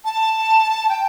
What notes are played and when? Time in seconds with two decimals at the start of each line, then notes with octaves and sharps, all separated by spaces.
0.05 A5
0.89 G5